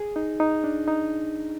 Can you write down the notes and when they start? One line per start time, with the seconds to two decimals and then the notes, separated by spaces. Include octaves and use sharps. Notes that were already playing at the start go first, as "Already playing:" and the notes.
Already playing: G#4
0.16 D#4
0.40 D#4
0.64 D4
0.88 D#4